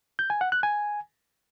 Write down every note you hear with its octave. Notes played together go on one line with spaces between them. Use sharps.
G6
G#5
F#5
F#6
G#5